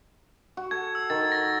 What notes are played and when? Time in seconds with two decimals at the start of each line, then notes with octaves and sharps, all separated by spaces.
0.57 F#4
0.71 A4 G#6
0.95 E6
1.10 D#3 A6
1.32 A#6